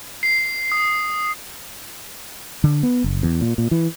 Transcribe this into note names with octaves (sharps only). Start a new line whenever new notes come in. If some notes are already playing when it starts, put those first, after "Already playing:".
C7
D#6
D3
B3
F#1
E2
A#2
A#2
E3